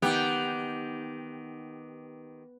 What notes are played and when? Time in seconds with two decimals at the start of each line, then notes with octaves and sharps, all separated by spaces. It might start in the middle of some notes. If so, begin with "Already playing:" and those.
0.02 D#3 B3 G4